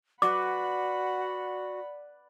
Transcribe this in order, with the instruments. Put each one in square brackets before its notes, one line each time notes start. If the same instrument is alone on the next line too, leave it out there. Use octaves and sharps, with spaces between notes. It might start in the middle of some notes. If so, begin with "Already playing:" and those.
[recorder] F#4 [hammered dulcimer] B4 D5 [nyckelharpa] F#5 B5 [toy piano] D6